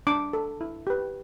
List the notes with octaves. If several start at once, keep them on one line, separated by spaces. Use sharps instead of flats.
D4 D6
A4
E4
G4 B4